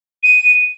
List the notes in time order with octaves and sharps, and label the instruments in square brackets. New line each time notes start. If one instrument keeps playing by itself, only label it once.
[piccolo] D#7